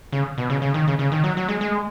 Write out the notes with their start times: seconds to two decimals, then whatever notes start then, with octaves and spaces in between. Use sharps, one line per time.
0.12 C#3
0.38 B2
0.50 C#3
0.62 C#3
0.74 D#3
0.88 C#3
0.99 C#3
1.12 D#3
1.24 F#3
1.37 F#3
1.48 G#3
1.61 G#3